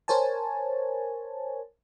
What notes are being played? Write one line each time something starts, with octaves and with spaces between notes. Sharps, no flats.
A#4 C5 C#5 G#5 A5